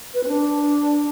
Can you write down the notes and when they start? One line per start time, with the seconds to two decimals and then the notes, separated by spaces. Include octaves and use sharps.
0.14 B4
0.23 C4
0.28 D4